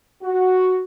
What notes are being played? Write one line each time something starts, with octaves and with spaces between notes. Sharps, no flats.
F#4